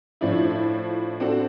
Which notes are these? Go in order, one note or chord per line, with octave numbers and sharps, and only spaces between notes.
A2 F3 D4 E4
C4 D4 F#4 A4